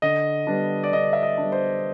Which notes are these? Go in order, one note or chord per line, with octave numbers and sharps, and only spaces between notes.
D3 D#5
G3 B3 D4
D5
D3 D#5
E5
D#5
G3 B3 D4
C5